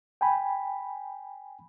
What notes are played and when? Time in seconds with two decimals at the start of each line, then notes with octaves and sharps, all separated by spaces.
0.21 G5 G#5 B5